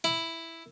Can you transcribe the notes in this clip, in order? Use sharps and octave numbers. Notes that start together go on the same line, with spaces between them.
E4